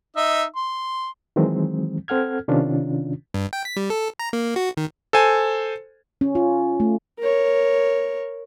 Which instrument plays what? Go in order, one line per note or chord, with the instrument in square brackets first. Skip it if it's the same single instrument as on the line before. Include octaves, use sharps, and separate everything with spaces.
[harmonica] D#4 D#5 E5
C6
[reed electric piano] D#3 E3 F#3 G#3 C4
C4 A4 F#5 F6 G#6
C3 D#3 C#4 D4 F4
[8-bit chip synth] G2
G5
B6
G3
A4
A#5
A#3
F#4
D#3
[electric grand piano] A4 C5 G#5
[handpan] C#4
F4
A3
[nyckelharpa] A#4 C#5